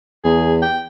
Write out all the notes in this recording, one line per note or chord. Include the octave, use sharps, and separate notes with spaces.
E2 G#4
G5